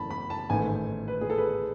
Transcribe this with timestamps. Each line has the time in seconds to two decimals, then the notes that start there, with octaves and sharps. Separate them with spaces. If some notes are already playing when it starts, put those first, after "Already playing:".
Already playing: F#1 F#2 E3 A3 A5 B5
0.10 B5
0.30 A5
0.50 A1 G#2 D#3 A3 G#5
1.08 B4
1.21 G#4
1.30 A4
1.38 B4